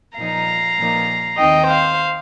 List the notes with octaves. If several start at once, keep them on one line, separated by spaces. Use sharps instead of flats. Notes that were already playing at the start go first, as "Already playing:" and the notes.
A#2 F3 D#4 F5 A#5
A#2 F3 A#3 D#4
D#2 D#3 C4 D#4 D#5 G5
C5 F5